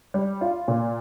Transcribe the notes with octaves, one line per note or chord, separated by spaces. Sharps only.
G3
F4
A#2